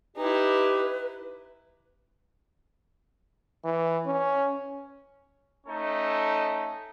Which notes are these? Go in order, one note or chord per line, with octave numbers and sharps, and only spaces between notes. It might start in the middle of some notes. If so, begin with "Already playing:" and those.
D#4 E4 G4 B4
E3
C#4
A3 C#4 D#4 A4